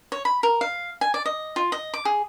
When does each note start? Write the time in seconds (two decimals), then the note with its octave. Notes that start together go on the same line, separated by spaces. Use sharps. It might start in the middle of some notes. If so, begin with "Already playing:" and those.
0.12 C#5
0.25 B5
0.43 A#4
0.61 F5
1.01 G#5
1.14 D5
1.26 D#5
1.56 F4
1.72 D#5
1.94 D6
2.05 G#4